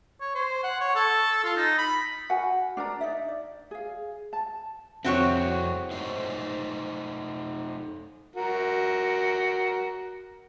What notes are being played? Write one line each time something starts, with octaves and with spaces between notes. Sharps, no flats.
C#5
C5
F#5
C#5
A4
F4
D#4
B5
F#4 A#4 F#5 G#5
D4 A#4 D5 A#5
D#4 D5 E5
D5
G#4 F5
A5
F2 C4 E4 F#4 C#5
A3 D#4 C5
F#4 A#4